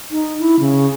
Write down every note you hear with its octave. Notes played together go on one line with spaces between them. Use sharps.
D#4
E4
C#3